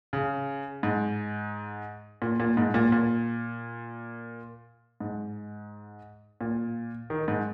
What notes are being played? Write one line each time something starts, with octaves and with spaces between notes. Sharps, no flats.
C#3
G#2
A#2
A#2
G#2
A#2
A#2
G#2
A#2
D#3
G#2